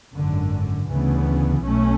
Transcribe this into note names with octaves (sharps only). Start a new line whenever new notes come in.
G#1 F#2 D3
D2 C#3 E3 B3
B1 B2 A3 C#4